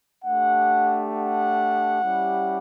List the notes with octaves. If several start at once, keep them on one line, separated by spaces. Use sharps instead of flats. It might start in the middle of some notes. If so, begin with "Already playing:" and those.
A3 D4 G4 F#5
F#5
G3 C#4 E4 G4